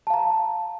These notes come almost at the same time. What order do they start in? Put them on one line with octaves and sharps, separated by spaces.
A5 F5 A#5